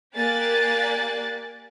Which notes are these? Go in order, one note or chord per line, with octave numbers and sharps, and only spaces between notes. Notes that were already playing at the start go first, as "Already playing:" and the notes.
A#3 G4 D5 G#5 F#6 A6